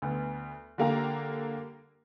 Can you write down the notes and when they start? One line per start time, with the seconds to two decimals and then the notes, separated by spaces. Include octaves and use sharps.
0.02 D2 B3
0.78 D3 G3 A#3 F5 G5 A#5